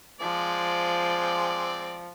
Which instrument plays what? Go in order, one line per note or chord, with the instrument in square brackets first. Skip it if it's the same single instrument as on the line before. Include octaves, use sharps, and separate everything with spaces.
[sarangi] F3 [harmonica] G#3 C4 D5